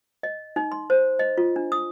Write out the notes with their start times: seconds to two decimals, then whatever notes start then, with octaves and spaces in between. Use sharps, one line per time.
0.23 D#5
0.56 D#4
0.72 C6
0.90 C5
1.19 D#5
1.38 F4
1.56 D4
1.72 D#6